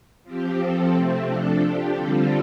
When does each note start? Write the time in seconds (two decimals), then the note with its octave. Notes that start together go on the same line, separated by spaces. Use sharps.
0.24 F3 C4 G4
0.58 F3 C4 A4
0.92 C3 A3 C4
1.26 F3 D4 A4
1.62 F3 D4 G4
1.96 D3 G3 C4 F4 A4